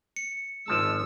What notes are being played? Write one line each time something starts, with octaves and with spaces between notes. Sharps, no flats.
C#7
G#1 F3 G#3 A5 E6